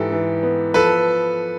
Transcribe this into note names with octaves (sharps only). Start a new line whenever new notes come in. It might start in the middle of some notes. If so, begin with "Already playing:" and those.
Already playing: G#2 E3 G4 A4
E3
B3
F3 A4 B4